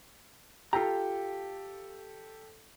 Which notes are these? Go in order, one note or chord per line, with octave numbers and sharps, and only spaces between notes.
F4 G4 A4 A#5